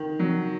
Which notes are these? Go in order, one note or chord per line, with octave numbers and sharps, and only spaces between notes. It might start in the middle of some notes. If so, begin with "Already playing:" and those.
Already playing: D#3
F#3